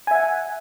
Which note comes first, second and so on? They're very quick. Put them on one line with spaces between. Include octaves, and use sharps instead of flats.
G#5 E5 F#5